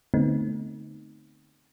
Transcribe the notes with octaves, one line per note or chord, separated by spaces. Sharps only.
D3 A3 B3 C4 D#4